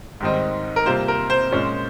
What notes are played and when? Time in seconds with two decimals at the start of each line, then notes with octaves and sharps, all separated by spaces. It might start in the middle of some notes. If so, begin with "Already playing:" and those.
0.20 G#2 D#3 G3 C4 D#4
0.76 A#4
0.86 C3 G3 A#3 F4 C5
1.08 A#4
1.30 C5
1.51 A#2 G#3 C#4 F4